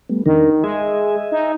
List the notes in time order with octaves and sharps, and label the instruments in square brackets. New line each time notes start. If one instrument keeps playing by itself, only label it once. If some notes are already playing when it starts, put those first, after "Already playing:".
[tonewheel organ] G3 A3 B3
[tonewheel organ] E2 D4 A#4 [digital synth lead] D#3
[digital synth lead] G#3 [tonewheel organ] D#5 E5 G#5
[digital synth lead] D#4